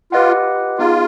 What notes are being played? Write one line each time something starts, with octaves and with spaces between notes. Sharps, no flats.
F4 G4 B4 D#5 F#5
B3 D#4 F4 G#4